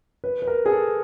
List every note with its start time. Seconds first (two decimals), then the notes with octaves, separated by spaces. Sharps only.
0.24 B4
0.42 B4
0.47 A#4
0.66 G#4
0.71 A4